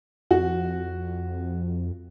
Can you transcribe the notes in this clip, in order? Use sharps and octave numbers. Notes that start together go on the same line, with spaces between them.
F2 F#4